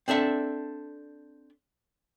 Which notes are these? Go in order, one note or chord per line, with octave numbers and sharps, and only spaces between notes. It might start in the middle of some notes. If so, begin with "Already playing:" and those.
C4 D4 A4 E5